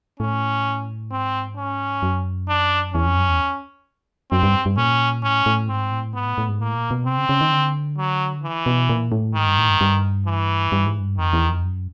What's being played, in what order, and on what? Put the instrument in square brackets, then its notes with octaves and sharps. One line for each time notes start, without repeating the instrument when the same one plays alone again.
[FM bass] A2 [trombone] C#4
[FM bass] G#2 [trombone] C4
[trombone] C#4
[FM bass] F#2
[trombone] D4
[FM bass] E2 [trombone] C#4
[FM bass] F2
F#2
E2
[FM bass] F#2 [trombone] C4
[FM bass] G2
G2
[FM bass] A#2 [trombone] C#4
[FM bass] A2 [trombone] C#4
[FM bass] A2
[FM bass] G#2 [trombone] C4
[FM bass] A2
[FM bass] G#2 [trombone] B3
[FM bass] A2
A2
G#2
[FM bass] A2 [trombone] A#3
[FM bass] A#2
B2
[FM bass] C3 [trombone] C4
[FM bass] C#3
C#3
D#3
D3
[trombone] F#3
E3
[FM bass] B2
A#2
A2
[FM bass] G#2 [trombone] D#3
[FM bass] G2
A2
G2
G2
[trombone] E3
[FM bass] G2
G#2
G2
[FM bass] F2 [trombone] D#3
[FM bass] E2
F2
F#2